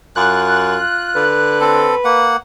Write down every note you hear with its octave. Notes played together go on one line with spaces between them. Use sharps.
F#2 F4 F#6
D3 B4
C4 A4
A#3 F#5